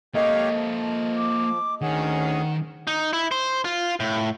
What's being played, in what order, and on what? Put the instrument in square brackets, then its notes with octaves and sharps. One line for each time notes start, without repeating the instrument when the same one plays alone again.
[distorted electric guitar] A#3 A4 [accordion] G4 C#5 F5 [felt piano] D#5
[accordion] F3
[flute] D6
[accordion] D2 C#4 G#4 [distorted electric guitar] D#3 [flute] F#5
[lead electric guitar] D#4
E4
C5
F4
A2